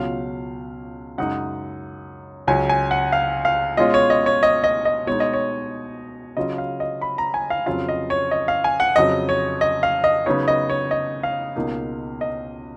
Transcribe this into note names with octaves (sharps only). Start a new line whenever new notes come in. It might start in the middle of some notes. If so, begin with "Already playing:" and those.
Already playing: C#2 B2 F#3 C#4 F4 F5
F#2 C#3 G#3 D#4 F#5
C#2 C#3 F#3 C#4 G#5
G#5
F#5
F5
F5
B2 G#3 C#4 F4 D#5
C#5
D#5
C#5
D#5
D#5
D#5
B2 G#3 D#4 C#5
D#5
C#5
C#3 F#3 C#4 F4 D#5
F5
D#5
B5
A#5
G#5
F5
F2 C#3 F#3 C#4 F4 F5
D#5
C#5
D#5
F5
G#5
F#5
F2 C#3 F#3 D#5
C#5
D#5
F5
D#5
C#3 F#3 B3 D#4 C#5
D#5
C#5
D#5
F5
C#2 B2 A#3 D#4
D#5